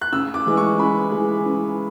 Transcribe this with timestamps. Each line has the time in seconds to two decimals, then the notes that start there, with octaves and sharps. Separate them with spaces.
0.01 F#6
0.13 C#3 E6
0.34 D6
0.46 E3 G#3
0.57 C#6
0.79 C#3 B5
1.12 E3 G#3
1.46 C#3